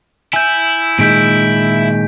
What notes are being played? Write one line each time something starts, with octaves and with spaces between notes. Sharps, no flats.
E4 G#5 G6
A#2 D#3 G#3 G6 B6 D7